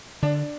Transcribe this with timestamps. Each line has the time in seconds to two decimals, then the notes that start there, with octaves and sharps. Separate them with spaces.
0.22 D3 D4